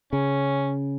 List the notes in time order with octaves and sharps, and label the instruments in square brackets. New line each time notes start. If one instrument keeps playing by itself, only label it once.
[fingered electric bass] C#3 [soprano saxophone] C#4